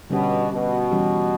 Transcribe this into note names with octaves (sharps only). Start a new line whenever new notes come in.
B2 D3 G3 C#4 G4
B2
E3 G3 C#4 G4